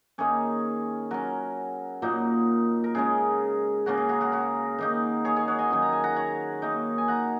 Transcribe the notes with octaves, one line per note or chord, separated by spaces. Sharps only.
D#3 A#3 C#4 G#4 C#5
F#3 C#4 F#4 A#4
A#2 F#3 A#3 D#4
A#4
C#3 G#3 C#4 G#4
C#3 A#3 C#4 F#4
G#4
F#4 A#4
F#4 A#4
F#4 A#4
D#3 A#3 D#4
G#4 C#5
G#4 C#5
C#5 F#5
D#5 G#5
D#3 F#3 C#4
A#5
G#5
F#5 A#5
C#5 F#5
D#3 A#3 D#4
G#5
F#5 A#5